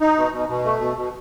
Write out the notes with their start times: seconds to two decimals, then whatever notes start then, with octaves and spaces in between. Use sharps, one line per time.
0.01 D#4
0.17 B2
0.32 B2
0.49 B2
0.65 A3
0.81 B2
0.97 B2